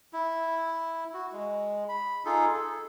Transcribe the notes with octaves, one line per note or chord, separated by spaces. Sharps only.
E4
F#4
G#3
B5
D#4 F4 G#4 A4
A4